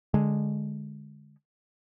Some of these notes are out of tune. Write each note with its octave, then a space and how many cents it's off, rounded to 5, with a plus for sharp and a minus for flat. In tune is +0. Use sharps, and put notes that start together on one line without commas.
D3 +0 G#3 +0